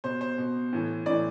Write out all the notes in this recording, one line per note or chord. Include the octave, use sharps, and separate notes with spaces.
B2 C5
C5
B2
A2 E3
A2 E3 D5